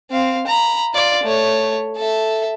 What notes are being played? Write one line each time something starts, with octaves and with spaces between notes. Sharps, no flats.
C4 F5
A#5 B5
F4 D5
A3 C#5
A4 E5